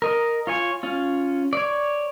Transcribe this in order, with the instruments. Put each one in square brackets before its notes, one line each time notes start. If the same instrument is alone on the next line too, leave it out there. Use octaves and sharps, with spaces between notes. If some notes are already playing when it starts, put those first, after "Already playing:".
[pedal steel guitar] A#4 D#5
F4 C#5 G#5
C#4 F4
C#5 D5